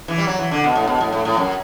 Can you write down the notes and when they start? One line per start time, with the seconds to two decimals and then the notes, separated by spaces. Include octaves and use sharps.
0.08 E3
0.18 G3
0.27 F#3
0.39 E3
0.51 D3
0.64 B2
0.75 A2
0.87 B2
1.01 A2
1.13 A2
1.25 A2
1.37 F#2